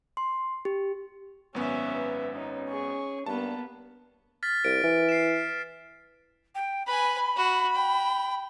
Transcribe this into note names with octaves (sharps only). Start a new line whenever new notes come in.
C6
G4
G#1 F#2 B3 C#4 E5
B4
C#4 D#4
G#4 C#6
G2 A#3 B3 A5
F6 A6 B6
C2 D7
E3
C7 E7
G5
B4 G#5 B5
F#4
G5